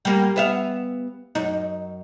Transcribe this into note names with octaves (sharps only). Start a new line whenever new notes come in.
G3 A#3
B3 E5 F5
F#2 D#4